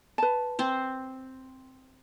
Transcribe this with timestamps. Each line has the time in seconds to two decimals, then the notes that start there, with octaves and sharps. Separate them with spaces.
0.18 B4 A5
0.59 C4 C5